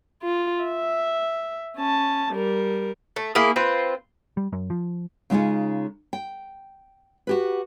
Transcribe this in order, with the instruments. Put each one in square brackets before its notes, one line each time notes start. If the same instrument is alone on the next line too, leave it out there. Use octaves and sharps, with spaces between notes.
[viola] F4
E5
C#4 A5
G3 A#4
[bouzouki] A3
A#3 E4 G#4
C4 F4 B4
[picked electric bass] G3
F#2
F3
[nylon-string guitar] C#3 G#3 D#4 F4 G#4
G5
F#4 G4 B4